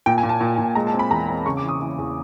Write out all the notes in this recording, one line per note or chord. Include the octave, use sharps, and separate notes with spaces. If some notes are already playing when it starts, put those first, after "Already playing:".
A#2 G5
G#5
A#2
A5
A#2
A#2
G#3 A#5
A5
C4
B5
E2 A#5
C4 B5
C#3 C#6
D6
E3
D#6
E3
E2